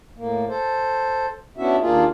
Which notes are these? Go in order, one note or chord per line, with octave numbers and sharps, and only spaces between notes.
A2 A#3
A4 C5
B3 C#4 D4 E4 F#4 E5
D#2 A#3 D4 F4 G#4